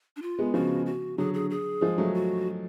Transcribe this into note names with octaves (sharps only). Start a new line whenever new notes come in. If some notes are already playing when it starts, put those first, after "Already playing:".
D4
F4
G#3 B3
C#3 F3 F#4
F#4
D3 F#3 G#4
G#4
G#4
F3 G#3
F#3 A3
F#4